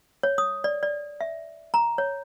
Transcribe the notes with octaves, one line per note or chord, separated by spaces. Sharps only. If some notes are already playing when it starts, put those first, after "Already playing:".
C#5
D#6
D5
D5
E5
A#5
C#5